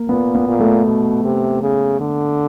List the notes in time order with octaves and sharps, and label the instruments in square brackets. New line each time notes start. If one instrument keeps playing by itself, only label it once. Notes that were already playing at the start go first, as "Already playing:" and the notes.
Already playing: [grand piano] A#3
[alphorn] A#2 [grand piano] B3
[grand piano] B3
[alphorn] A#2
[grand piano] A3
[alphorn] B2
C3
C#3
D3